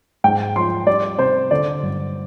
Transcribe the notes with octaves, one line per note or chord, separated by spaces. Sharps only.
G#2 G5
F3 C6
G3 D5
C3 C5
D3 D5
G2